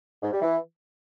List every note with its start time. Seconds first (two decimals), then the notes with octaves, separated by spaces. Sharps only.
0.21 G#2
0.31 G3
0.41 E3